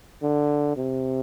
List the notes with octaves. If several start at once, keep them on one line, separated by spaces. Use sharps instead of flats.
D3
C3